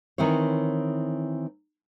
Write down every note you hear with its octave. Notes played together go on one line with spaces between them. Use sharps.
D#3 E3 C4 E4 C#5